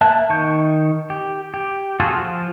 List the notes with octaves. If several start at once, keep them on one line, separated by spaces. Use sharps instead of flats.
A#3 E5 A5 F#6
D#3 C#6 G6
G4
G4
F4 F#4 G#4 A4
F3